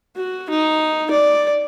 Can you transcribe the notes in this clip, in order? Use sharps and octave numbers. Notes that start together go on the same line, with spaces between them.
F#4
D#4
D5